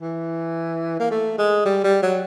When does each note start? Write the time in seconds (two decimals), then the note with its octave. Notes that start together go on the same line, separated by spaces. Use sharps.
0.02 E3
1.00 A#3
1.11 A3
1.38 G#3
1.65 G3
1.84 G3
2.02 F#3